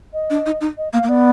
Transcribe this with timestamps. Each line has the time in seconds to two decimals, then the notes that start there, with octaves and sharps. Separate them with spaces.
0.13 D#5
0.30 D4
0.46 D#4
0.61 D#4
0.78 D#5
0.93 A#3 F5
1.03 A#3
1.09 B3 D5